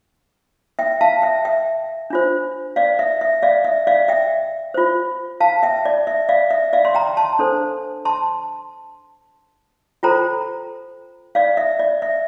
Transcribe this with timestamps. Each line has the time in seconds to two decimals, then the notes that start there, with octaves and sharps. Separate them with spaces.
0.79 E5 G5
1.01 F5 A5
1.22 E5 G5
1.45 E5 G5
2.10 D4 F4 C5
2.76 D5 F5
2.99 E5
3.21 E5
3.42 D5 F5
3.64 E5
3.87 D5 F5
4.08 E5 G5
4.74 F4 C5
5.40 F5 A5
5.63 E5 G5
5.85 D5
6.07 E5
6.29 D5 F5
6.51 E5
6.73 D5 F5
6.85 C6
6.95 G5 A#5
7.17 A5 C6
7.39 D4 A4 C5
8.05 A5 C6
10.03 F4 A4 C5 G5 A#5
11.35 D5 F5
11.57 E5
11.79 D5
12.02 E5